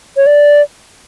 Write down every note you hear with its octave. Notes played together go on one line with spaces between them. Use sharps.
C#5
D5